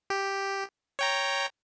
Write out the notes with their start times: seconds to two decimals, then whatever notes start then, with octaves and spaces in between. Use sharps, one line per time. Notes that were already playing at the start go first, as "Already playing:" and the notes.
0.10 G4
0.99 C#5 G5 A#5